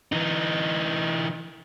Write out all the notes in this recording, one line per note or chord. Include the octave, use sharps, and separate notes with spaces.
E3 D#4